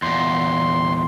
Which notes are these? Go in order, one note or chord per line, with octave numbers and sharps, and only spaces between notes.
E2 A#2 C6